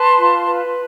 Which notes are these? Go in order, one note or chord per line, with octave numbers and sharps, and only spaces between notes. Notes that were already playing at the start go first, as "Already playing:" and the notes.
Already playing: B4 A5 C6
F4
B4